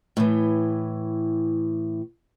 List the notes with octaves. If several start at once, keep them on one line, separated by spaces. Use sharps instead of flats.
A2 E3